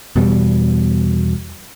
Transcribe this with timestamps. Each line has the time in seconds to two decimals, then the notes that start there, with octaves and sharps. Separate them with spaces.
0.16 E2 B2 G3